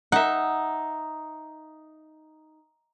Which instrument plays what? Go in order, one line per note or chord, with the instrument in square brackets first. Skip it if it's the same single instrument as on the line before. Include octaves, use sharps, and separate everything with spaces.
[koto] D#4 E5 [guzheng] F#5